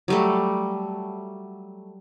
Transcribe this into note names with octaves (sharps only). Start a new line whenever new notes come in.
F#3 G3 A3